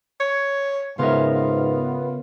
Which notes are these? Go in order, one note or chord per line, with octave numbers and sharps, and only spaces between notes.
C#5
G#2 C#3 B3 F4 A#4 E5
F4